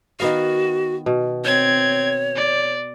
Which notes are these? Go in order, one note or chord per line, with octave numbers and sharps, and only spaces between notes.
D#3 B3 F#4 F5
B2
C4 C#5 G#6
D5